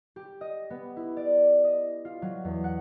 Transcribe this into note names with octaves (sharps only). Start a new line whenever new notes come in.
G4
D#5
B3
E4
D5
D#5
F4
F#3
E2
F#5